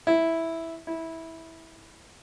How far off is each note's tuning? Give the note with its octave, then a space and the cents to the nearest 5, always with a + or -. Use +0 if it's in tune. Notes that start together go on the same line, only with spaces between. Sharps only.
E4 -5
E4 -15